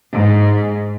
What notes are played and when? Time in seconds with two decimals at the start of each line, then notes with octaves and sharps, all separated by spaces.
0.14 G#2